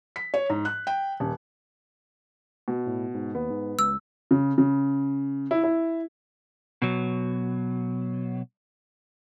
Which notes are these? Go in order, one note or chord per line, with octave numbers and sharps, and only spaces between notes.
B6
C#5
G#2
F#6
G5
D#1
B2
A2
G#2
D#2 B3
G#2
C#2 E6
C#3
C#3
E4
E4
B2 F#3